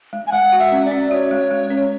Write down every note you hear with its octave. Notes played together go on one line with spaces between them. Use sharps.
G#3
G#5
G#3 F#5
F#4
E5
C#4
D5
C#4
F#4 C#5
G#3
G#3
C#4